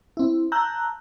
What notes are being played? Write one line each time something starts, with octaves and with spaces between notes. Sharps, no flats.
C4 E4
A5 A#5 E6 F#6 G6